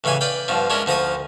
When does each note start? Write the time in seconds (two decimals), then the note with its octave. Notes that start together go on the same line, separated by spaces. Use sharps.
0.04 A1 C#3 E3 E5 G#5
0.21 B4 D5 F5 G5
0.48 G2 B2 F3
0.70 G#3 C#4 D4 E4 A#4
0.86 D2 F3 A#5 C#6 D#6